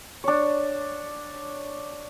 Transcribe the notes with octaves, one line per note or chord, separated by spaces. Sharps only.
D4 C#5